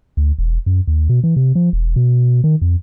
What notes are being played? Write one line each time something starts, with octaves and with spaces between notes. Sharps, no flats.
D2
E1
F#2
D#2
B2
E3
C3
F3
E1
B2
D#3
F2